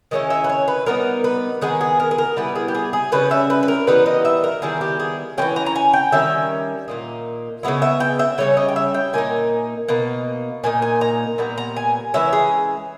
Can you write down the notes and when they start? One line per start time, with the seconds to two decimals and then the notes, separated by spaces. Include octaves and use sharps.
0.11 D#3 G#3 C#4 E4 D#5
0.30 E5
0.44 B4
0.49 C#5
0.68 B4
0.86 G3 B3 D#4 A#4
1.24 B4
1.61 D#3 G#3 B3 G#4
1.81 G#4
2.00 A#4
2.11 G#4
2.18 A#4
2.37 G3 B3 E4 B4
2.55 G#4
2.68 G4
2.75 G#4
2.93 G#4
3.12 C#3 G3 C#4 B4
3.31 E5
3.50 B4
3.63 B4
3.68 A#4
3.87 E3 G3 B3 D#4 B4
4.06 D#5
4.25 E5
4.44 A#4
4.62 D#3 G3 B3 E4 G#4
4.81 G4
5.00 G#4
5.38 G#3 C#4 G5
5.42 E3
5.56 A#5
5.66 A#5
5.76 G#5
5.93 G5
6.12 D#3 G3 C#4 E5
6.88 A#2 A#3 D#4
7.63 C#3 G#3 B3 E4
7.82 E5
8.00 G5
8.19 E5
8.38 C#3 G3 C#4 C#5
8.57 D#5
8.68 G5
8.76 E5
8.94 G5
9.13 A#2 A#3 D#4 G#5
9.88 B2 A#3 D#4
10.64 A#2 A#3 D#4 G#5
10.82 G#5
11.01 A#5
11.38 A#2 G3 B3 A#5
11.58 A#5
11.76 G#5
12.14 E3 G#3 C#4 E5
12.33 G#4